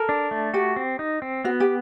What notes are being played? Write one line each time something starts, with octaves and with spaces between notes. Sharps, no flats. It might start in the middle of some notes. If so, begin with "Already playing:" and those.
Already playing: A4 A#4
D4
A3
F#4 G4
C4
D#4
C4
B3 F#4
G4